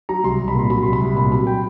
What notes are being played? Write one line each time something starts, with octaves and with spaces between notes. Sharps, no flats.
F#3 A#5
C2 C6
C2
B5
A#2 C6
F#3 B5
C2 C6
B5
C2
A#2 B5
F#3 B5
G5